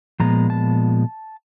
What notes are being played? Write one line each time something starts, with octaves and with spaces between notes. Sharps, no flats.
A#2 F3 G#3 B3 A#5
A5